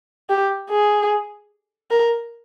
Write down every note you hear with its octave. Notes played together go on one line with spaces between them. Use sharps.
G4
G#4
A#4